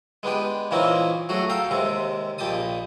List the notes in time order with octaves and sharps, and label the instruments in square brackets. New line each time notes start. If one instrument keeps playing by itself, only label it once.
[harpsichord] G#3 B3 D4 G4
A#2 E3 A#3 C4 C#4 D#4
F#3 A3 F#4 G#4
A4 F5 G5 A#5
D#2 C3 G#3 E5
A#1 A#2 G4 D#5 A5 D#6